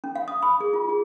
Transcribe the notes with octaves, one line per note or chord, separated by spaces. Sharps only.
C#4
F5
D#6
B5
G#4
F4
G#4